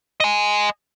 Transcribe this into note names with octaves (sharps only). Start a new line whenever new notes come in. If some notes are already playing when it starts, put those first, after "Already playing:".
D#5 G#5